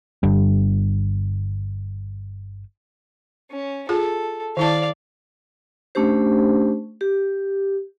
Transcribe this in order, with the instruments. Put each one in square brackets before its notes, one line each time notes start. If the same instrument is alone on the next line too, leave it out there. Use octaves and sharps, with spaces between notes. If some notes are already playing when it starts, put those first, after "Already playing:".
[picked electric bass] G1 G2
[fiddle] C#4
[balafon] F4 G#4 [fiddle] A4
[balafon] D#3 E4 A5 [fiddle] D5 F5
[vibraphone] A3 C#4 D4 G4 C5
G4